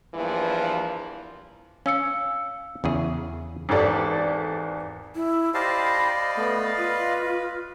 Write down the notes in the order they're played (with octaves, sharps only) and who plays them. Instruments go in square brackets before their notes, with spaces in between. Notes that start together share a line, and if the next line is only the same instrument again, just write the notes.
[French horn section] E2 G2 E3 F3 A#3
[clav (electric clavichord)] C#4 [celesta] F5 E6 C#7
[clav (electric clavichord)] E2 C#3 G#4
[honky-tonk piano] G#1 E2 G4 A4 D5
[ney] E4
[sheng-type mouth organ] G4 C5 A5 [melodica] D5 D#5 F5 [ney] B5
[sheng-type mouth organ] A3 B3 [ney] B4
[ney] F4 [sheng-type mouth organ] B4